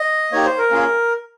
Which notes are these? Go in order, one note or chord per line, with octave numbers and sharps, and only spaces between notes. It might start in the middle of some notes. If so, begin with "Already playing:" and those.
Already playing: D#5
A#3 D#4 G4 C#5
C5
A#4
A#3 C#4 F4 G#4